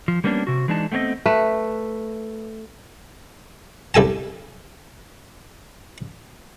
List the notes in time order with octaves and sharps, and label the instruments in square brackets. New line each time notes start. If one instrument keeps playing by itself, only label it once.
[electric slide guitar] F3
G3 A#3 B3 C#4 D4
C3 F#4
E3 G#3 D4 D#4 A5
A3 B3 C4 C#5 D#5
[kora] A3 B4
[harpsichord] C2 A4 G#5 A5